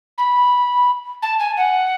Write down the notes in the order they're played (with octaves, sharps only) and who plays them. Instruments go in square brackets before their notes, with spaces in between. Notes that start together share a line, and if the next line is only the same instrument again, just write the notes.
[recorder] B5
A5
G#5
F#5